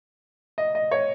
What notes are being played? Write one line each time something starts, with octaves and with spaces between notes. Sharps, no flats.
D#5
D#5
C#5